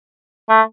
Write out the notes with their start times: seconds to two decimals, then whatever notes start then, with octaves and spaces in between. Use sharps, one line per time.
0.49 A3